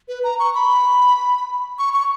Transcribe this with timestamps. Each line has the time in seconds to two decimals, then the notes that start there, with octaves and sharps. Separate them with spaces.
0.08 B4
0.24 A#5
0.39 C#6
0.55 B5
1.79 C#6
1.94 C#6